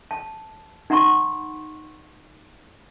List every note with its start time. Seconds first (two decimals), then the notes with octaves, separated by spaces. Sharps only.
0.11 A5
0.90 D#4 F#5 A#5 C6 C#6